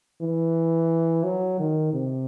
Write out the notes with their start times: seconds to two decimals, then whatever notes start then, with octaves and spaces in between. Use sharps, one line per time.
0.22 E3
1.24 F#3
1.60 D#3
1.93 C3